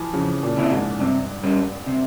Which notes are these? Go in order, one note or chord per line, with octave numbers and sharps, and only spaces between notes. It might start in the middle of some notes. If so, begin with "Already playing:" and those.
Already playing: E3 F3
F2 C#3
A#2
C3 E3 A#3 E4
G#2
G2 C3
G3 C#4
C3